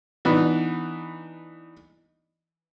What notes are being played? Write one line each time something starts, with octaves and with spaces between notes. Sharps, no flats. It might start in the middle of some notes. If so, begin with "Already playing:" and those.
E3 B3 D4 D#4